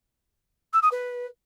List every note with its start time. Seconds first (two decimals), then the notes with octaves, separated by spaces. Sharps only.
0.73 E6
0.82 D#6
0.91 B4